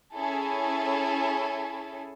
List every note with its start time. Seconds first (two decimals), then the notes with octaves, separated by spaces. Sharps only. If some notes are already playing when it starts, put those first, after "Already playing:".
0.14 C#4 E4 G#4 A4